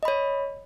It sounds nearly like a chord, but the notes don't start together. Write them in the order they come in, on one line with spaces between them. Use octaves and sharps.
D#5 B5 C#5